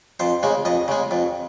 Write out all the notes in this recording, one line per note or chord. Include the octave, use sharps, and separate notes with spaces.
F2 C5
C#3 G#3
F2 D#5
C#3 G#3
F2